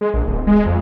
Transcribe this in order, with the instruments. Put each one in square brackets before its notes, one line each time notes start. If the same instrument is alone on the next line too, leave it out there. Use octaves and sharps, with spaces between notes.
[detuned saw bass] G#3
A#1
D1
G#3
F2